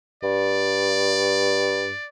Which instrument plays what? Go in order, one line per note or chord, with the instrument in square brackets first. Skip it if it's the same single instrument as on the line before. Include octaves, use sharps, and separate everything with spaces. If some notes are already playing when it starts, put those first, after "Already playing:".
[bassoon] G2 [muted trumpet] D5